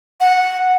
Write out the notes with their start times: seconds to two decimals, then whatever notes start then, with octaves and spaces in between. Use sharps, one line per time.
0.20 F#5